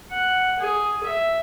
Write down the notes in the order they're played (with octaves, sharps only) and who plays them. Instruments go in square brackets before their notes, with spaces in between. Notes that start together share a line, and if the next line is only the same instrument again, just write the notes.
[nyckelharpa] F#5
G#4
E5